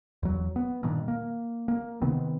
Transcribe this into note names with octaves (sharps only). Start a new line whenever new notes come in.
E2 F#3
B3
G2 A#2 D#3
A#3
A#3
C3 D#3 B3 C4